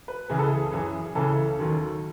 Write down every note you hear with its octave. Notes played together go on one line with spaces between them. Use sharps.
B4
C#2 C#3 E3 G#4
A4
G#4
F#2 E3 G#4
C#2 C#3 E3 A4
D#2 D#3 F#3